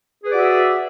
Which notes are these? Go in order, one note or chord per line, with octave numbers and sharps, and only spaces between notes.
F#4 G#4 B4 D5 E5